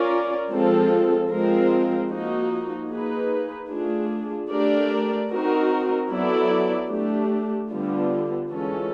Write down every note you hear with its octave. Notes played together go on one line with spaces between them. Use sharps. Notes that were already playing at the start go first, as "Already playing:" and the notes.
Already playing: C#4 F4 A#4 D5
F3 G#3 C4 F4 A4
F3 G#3 C4 F4 A#4
F3 A#3 D#4 F#4
A#3 D#4 G#4 B4
A3 D4 F4 G#4
A3 D4 G4 A#4 D5
C4 D#4 F#4 A#4
F#3 B3 E4 A4 D5
A3 D4 G4
D3 G3 B3 D4 F4
E3 G#3 C#4 F4 A4